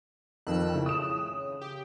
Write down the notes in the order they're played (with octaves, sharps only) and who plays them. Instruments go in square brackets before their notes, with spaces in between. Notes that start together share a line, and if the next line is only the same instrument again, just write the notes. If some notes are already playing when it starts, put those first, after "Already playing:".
[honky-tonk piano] F2 D#3 F3 [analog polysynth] E6 F#6
[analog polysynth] C#3 [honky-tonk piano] A3 E4
[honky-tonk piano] D#6 E7
[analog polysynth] G4